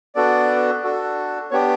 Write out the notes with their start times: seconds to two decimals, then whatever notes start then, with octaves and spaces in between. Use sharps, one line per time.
0.15 B3 D4 F#4 A4 D5
0.84 D4 F#4 A4
1.51 B3 D4 G4 C#5